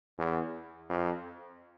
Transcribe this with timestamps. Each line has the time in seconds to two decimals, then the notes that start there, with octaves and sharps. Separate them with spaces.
0.18 E2
0.89 F2